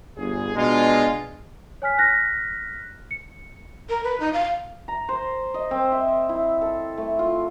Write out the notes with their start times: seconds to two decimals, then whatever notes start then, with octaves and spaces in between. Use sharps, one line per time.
0.17 G1 G#4
0.56 B2 G#3 D4 F4
1.82 C#5 G#5 F6 B6
1.98 F6 F#6 A#6 B6
3.11 C#7
3.89 A#4
4.04 B4
4.20 D#4
4.33 F5
4.88 A#5
5.09 C5
5.54 D#5
5.71 C4
5.92 E5
6.29 E4
6.61 A4
6.98 A3
7.19 F4